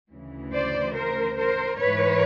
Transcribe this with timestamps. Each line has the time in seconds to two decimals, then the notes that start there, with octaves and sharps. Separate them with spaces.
0.12 D2 C#3 E3
0.54 C5 D5
0.96 A#4 C5
1.38 A#4 C5
1.79 G#2 E3 B4 C#5